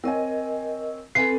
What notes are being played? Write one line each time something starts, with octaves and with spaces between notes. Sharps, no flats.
C4 A#4 C#5 D#5 G#5
C4 A4 B4 G#5 C7